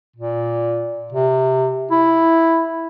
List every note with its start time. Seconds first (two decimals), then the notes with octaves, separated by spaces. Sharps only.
0.16 A#2
1.13 C3
1.91 E4